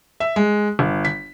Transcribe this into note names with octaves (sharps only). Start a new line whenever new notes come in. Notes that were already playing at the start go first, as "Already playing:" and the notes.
E5
G#3
G1
B6